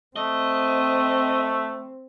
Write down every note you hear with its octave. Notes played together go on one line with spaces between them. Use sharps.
A3 C4 D#5